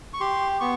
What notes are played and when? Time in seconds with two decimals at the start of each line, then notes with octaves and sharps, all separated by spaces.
0.14 C#6
0.20 G4 C6
0.60 B3 C#6